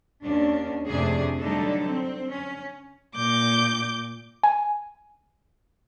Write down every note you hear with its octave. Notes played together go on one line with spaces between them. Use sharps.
D#2 C#4 D4
F2 A2 C3 A3 D4 G#4
D3 F#3 G3 D4 D#4 A4
C4
C#4
A#2 D6 G6
G#5